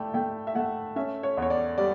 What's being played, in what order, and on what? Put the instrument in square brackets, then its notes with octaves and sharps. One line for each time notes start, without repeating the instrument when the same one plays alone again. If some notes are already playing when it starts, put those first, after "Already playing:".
Already playing: [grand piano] A3 E4 D5 G5
A3 G5
E5
A3 F#5
C#4 E5
C#5
E2
C#5
D5
G3 D5